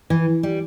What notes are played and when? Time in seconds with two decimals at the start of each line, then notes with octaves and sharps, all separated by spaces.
0.10 E3
0.43 G3